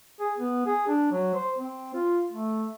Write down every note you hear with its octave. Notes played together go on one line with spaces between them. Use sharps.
G#4
B3
G#4
D4
F#3
C5
C4
F4
A3